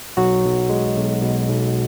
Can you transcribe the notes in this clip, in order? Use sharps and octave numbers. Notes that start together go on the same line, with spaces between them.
B1 F#3 F#4
B1
G#3
B1
B2
B1